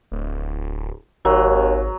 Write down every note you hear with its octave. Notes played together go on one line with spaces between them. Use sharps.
D1
G#1 D#2 F#3